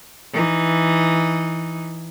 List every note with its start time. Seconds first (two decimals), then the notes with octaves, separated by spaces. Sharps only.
0.33 E3 D#4